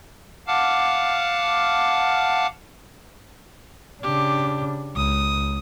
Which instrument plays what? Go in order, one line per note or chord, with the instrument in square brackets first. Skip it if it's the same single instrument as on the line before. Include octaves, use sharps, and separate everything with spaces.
[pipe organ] F5 F#5 A5 D6 F6
[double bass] C#3 D4 [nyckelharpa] G4
[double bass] C#2 [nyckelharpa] D#6